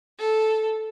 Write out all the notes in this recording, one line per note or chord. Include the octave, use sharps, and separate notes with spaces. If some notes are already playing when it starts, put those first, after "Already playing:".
A4